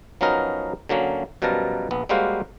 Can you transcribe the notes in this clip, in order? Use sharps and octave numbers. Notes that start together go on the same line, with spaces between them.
F3 F#3 B3 C#4 D#4 A#4
D3 F#3 A#3 C#4
F#2 B2 F3 G3 A#4 A5
A#1 B3
G3 G#3 A#3 F#4 C5 F5